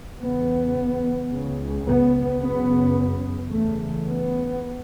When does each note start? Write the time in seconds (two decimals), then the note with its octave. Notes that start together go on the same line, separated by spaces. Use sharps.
0.19 E2 C#3 B3
1.30 C#2 C#3
1.86 B3
2.41 F#2 C#3 B3
3.51 E2 C#3 A3
4.07 B3